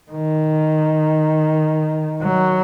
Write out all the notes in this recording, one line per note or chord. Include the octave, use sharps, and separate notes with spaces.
D#3
F#3